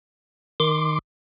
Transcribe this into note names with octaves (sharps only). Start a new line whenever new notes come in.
D#3 C6 D6